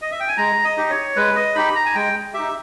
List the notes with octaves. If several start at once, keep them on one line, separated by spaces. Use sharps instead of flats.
D#5
E5
G5
G#5
G#3 A#5
D#5
D#4 G4
C#5
G#3 B4
D#5
D#4 G4 B5
A#5
G#5
G#3 G5
D#4 G4 E5